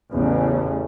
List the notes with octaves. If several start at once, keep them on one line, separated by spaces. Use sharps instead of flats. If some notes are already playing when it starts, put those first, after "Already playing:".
A1 E2 C#3 A3